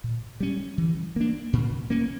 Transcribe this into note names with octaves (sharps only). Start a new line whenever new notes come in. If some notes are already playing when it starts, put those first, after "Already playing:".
A#2
G3 C#4
E3
A#3 D4
A#2
A#3 C#4